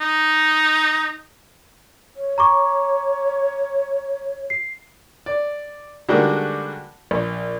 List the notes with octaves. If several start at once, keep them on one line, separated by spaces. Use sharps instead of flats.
D#4
C#5
A#5 C#6 D6
C7
D5
D3 G3 G#3 A#3 D#4 F#4
A#1